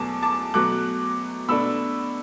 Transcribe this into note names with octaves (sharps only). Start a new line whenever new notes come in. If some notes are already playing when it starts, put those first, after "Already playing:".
Already playing: E2 B2 F#3 A3 A5 D6
A5 D6
B2 F#3 A3 D6 F#6
B2 A3 D4 B5 E6